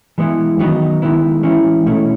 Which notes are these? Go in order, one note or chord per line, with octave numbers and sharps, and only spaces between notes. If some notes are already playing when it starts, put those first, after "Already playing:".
E3 G#3 B3 E4
D#3 F#3 B3 D#4
D#3 G#3 B3 E4
E3 G#3 C#4 E4
B2 A3 C#4 E4